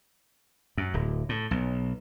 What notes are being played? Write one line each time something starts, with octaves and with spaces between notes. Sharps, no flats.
F#2
D1
A2
B1